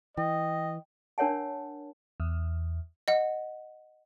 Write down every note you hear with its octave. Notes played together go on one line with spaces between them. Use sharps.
E3 D#5 G5
D4 A#4 C#5 F#5 A5
E2
D#5 F#5